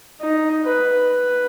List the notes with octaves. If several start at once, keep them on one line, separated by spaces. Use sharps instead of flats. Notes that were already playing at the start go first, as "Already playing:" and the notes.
D#4
B4
B4